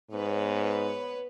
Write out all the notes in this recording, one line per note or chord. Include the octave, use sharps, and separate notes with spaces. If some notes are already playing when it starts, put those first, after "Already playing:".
G#2 B3 B4 C#5